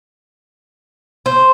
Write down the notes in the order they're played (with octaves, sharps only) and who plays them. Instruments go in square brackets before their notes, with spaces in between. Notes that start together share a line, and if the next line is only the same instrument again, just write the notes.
[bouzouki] C5